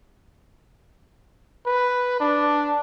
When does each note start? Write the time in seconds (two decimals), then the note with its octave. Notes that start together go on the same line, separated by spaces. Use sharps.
1.66 B4
2.20 D4